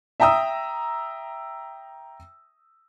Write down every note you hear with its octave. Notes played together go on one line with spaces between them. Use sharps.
E5 G5 A#5 D#6 E6